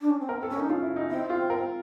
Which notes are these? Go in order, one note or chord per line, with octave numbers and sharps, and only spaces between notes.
D4
C#4
C4
B3 A#4
C4
A4
C#4
A#4
D#4
C#4 F4
E4
D#4
C4 E4
F4
A#4